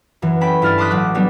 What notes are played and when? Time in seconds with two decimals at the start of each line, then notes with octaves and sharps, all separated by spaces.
0.22 F#2 E3
0.41 C#4 A4 G5 B5
0.62 G2 E4 F6 A6
0.78 A5 C6 D6 D#6 F#6 B6
0.90 A1 F#3 F#6
1.14 F#3 G3 B3 D4